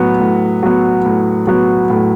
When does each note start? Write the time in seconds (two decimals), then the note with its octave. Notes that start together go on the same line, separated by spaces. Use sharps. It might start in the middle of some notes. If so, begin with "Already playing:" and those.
Already playing: A2 F#3 B3
0.20 A2
0.63 F#3 B3
1.06 A2
1.47 F#3 B3
1.90 A2